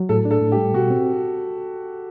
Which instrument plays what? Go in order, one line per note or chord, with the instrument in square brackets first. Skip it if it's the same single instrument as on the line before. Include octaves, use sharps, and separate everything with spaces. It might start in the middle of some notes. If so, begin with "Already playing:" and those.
Already playing: [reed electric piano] F#3
[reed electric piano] A2 [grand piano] A4
[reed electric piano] D4
[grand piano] A4
[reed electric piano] A2
[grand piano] G4
[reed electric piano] G3
[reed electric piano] B2 [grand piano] F#4
[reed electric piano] C4